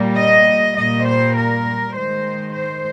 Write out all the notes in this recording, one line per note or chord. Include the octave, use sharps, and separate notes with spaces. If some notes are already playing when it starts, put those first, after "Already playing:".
Already playing: A#2 G3 A#3
D#5
A#2 G3 A#3 D#5
C5
A#4
D#3 G#3 C5
C5